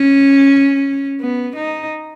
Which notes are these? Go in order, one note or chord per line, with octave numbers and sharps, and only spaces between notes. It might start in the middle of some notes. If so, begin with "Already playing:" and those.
Already playing: C#4
B3
D#4